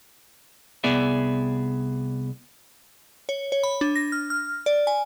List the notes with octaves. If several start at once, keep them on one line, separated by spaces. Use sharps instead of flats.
C2 B3 G#4 D5 E5
C#5
C#5
B5
D4
A#6
F6
F6
D5
G#5